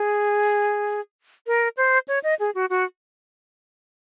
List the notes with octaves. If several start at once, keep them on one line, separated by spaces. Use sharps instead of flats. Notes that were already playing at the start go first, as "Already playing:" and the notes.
Already playing: G#4
A#4
C5
C#5
D#5
G#4
F#4
F#4